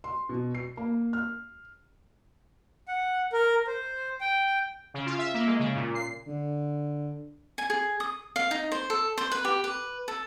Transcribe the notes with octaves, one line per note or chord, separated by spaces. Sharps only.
C6
B2
C7
A#3
F6
F#5
A#4
C5
G5
C#3
F4
E5
A#3
G#3
C#3
A#2
C7
D3
G#5
G#4
D#6
F5
D#4
C5
A4
C5
B4
G4
B4
A4